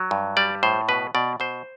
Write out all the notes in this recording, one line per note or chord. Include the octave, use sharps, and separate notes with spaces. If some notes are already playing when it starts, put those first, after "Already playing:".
Already playing: F#3
G2
G3 D5
A2 C5
B2 B4
B2 D5
B2 C5